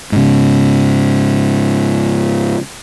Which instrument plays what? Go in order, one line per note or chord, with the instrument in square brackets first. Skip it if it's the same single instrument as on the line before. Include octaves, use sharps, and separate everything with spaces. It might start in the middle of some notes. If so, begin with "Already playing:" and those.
[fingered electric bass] G#2 C#3